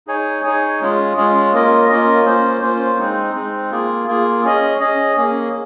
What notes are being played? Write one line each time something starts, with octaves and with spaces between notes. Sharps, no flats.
D#4 G#4 C#5 G#5
D#4 G#4 C#5 G#5
G#3 C#4 F4 G#4
G#3 C#4 F4 G#4
A#3 C#4 F4 A#4 D#5
A#3 C#4 F4 A#4 D#5
A#3 C#4 F4 C5
A#3 C#4 F4 C5
G#3 C4 D#4
G#3 C4 D#4
A#3 F4 G#4
A#3 F4 G#4
C#4 G#4 D#5
C#4 G#4 D#5
A#3 C#4 G#4